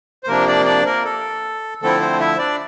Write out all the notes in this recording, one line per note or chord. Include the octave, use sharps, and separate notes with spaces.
C5
C3 F3 A#3 D4 A#4
D4 D5
D4 D5
A#3 A#4
A4
D3 F3 A3 C4 E4 A4
C4 C5
E4 E5
D4 D5